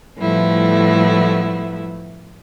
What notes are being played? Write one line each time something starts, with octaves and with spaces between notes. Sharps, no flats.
A2 F3 G3 A3 B3 E4